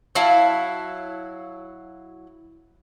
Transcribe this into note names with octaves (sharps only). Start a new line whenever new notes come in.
F#3 E4 F5 A5